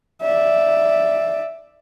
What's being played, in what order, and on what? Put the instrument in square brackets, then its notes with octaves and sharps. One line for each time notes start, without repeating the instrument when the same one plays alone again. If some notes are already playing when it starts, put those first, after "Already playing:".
[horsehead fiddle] D5 E5